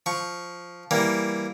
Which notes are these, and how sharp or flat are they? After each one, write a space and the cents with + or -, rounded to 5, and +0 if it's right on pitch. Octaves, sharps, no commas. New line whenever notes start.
F3 +0 C#6 +0
E3 +0 G3 +0 A#3 +0